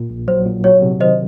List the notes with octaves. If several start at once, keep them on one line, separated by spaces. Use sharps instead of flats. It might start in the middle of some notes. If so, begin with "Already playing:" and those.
Already playing: A#2
A#1
F#3 C5
A#2
F#3 C#5
C3
D#3 C5 D#5